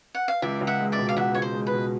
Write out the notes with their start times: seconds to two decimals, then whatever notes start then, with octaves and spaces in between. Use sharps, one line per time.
0.15 F#5
0.28 F5
0.42 C#2 D5 E5
0.61 C#2
0.67 E5 F#5
0.80 G#3
0.92 D5 E5
0.99 B2
1.09 F5
1.17 C#2 E5 F#5
1.35 C#2 C#5
1.42 C5
1.54 G#3
1.67 B4
1.73 B2